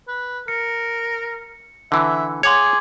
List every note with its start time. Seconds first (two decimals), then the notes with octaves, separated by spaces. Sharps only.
0.08 B4
0.48 A#4 C#7
1.92 D3 E3 E5
2.43 G#4 C#5 F#5 C6 D6 G#6